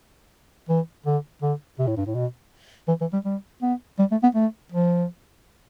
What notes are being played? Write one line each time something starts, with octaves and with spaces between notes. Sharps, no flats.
E3
D3
D3
C3
A2
G2
A2
B2
E3
E3
G3
G3
B3
G3
A3
B3
A3
F3